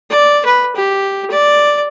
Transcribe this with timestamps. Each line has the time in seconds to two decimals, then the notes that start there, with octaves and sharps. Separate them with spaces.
0.11 D5
0.45 B4
0.76 G4
1.30 D5